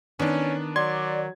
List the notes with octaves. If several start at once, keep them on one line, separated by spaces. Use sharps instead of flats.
D#3 B3 C#4 D4
F#3 D5 C6 G#6